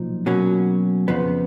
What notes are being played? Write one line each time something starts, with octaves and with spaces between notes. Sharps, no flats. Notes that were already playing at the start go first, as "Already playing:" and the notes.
Already playing: B1 A#2 F3 D#4
B2 F#3 A#3 C#4
F2 C#3 F3 B3